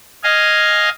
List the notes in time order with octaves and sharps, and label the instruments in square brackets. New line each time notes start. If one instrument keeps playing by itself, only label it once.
[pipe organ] D#5 F5 G#5